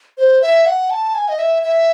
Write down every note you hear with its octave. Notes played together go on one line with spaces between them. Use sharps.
C5
E5
F#5
A5
G#5
D#5
E5
E5